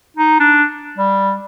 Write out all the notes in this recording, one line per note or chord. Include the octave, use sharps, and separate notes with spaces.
D#4
D4
G3